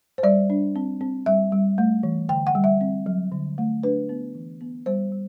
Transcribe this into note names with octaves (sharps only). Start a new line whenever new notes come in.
C5
G3 D5
D4
C4
C4
G3 E5
G3
A3
E3
D3 G5
F#5
G3
E5
C4
F#3
D3
A3
D4 B4
B3
E3
B3
G3 C5
G3